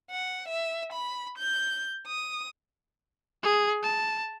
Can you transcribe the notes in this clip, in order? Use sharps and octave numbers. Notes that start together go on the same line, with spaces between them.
F#5
E5
B5
G6
D#6
G#4
A5